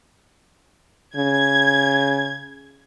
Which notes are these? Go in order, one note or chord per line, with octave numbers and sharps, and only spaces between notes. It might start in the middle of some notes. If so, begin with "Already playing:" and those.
C#3 G#6